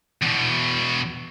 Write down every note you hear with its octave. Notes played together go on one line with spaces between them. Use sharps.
E2 B2